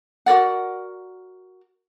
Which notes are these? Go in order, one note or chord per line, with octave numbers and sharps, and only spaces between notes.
F#4 A#4 D5 F#5